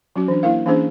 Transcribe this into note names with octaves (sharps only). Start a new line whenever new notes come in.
F#3 C#4 F#4
E3 D4
A#3 E4 A#4 F5
E3 A#3 C#4 D4 G#4 C5